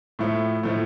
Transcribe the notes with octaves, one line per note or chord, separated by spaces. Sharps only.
A2 F3 A3
A2 F3 A3